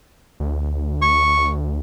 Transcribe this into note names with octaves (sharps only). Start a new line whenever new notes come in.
D2
C#6